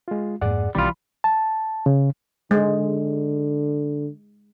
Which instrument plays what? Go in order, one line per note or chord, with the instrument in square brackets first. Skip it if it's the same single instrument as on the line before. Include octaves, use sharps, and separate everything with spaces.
[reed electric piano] G#3 F4
[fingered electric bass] F2 G#2 A#3 [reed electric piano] G#4 D5 F#5
[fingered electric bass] B1 D#3 C4 [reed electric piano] E3 B5 [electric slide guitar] G3 F4
[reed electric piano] A5
C#3
[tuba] D3 [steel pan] G#3